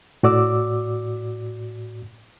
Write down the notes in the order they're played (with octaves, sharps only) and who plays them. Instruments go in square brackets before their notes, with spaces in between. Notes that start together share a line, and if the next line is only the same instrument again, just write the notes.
[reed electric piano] A2 F#4 D5 D6 E6